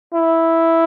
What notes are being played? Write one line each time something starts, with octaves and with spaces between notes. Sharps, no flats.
E4